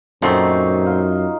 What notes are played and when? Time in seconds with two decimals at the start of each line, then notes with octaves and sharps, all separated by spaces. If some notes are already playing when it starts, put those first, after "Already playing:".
0.22 F#2 A#2 A3 C4 D#4 F#4
0.86 F4